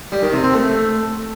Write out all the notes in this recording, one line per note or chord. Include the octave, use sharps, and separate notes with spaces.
G3
D#3
C3
C4
A3